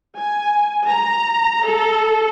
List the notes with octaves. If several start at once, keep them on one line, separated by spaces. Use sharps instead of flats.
G#5
A#5
A4